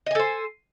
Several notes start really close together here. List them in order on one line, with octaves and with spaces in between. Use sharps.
D#5 G#5 A4 C5